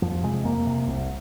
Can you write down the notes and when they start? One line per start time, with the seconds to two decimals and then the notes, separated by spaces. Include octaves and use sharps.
0.02 F2 F3
0.23 C3 G#3
0.45 F2 A#3
0.66 C3
0.87 C2